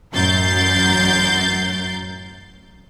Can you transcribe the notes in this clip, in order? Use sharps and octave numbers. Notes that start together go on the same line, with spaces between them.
A1 F#2 A#4 G6 A6 C7